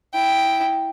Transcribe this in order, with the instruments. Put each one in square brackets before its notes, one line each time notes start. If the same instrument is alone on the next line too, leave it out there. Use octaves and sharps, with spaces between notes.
[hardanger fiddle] E4 G5